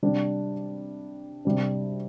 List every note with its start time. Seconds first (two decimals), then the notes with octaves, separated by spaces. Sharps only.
0.03 C3 G3 D4
1.45 C3 G3 D4